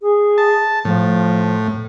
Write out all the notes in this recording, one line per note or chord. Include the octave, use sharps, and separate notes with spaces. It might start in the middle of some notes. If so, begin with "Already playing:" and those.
G#4
A5
A2 F3